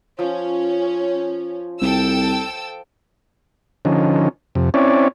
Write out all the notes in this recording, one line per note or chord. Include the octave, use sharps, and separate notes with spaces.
F3 C#4
C2 A4 G5 E6
D3 F3 C#4 D#4
F2 C3
C4 C#4 E4 C#5 D5